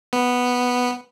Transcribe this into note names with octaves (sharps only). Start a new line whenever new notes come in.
B3